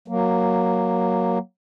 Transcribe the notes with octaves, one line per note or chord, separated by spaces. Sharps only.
F#3 A#3